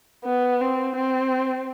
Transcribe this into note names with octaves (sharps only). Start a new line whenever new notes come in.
B3
C4
C4